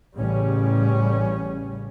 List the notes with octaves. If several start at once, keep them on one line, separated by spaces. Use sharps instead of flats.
A1 C#3 G3 C#4